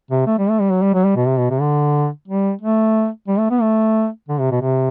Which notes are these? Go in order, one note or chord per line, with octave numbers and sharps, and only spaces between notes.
C3
A3
G3
A3
G3
F#3
G3
F#3
G3
B2
C3
B2
C3
D3
G3
A3
G3
A3
B3
A3
D3
C3
B2
C3